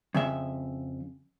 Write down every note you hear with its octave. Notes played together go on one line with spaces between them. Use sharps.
F2 C#3 E5